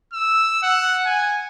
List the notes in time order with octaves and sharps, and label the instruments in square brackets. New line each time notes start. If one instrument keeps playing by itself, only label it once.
[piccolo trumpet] E6
F#5
G#5